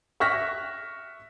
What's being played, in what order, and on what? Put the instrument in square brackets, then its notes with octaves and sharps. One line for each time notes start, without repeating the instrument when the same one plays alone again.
[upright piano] E5 C#6 F6 F#6 A#6 B6